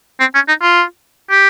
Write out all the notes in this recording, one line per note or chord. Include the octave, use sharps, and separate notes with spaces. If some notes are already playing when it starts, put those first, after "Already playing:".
C4
C#4
D#4
F4
G4